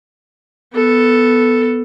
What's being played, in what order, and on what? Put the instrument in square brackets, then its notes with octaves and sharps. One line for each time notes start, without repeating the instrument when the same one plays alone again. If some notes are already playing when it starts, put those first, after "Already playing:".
[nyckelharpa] B3 A4